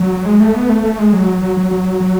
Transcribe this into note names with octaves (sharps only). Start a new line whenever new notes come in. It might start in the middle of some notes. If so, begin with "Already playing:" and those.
Already playing: F#3
G#3
A3
B3
A3
A3
G#3
F#3
F#3
F#3
F#3
F#3